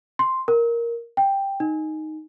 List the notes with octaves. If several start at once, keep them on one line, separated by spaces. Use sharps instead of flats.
C6
A#4
G5
D#4